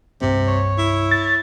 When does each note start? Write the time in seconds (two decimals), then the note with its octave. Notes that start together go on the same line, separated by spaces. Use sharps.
0.21 C2 G2 C3 C4
0.47 C#5
0.78 E4
1.11 A6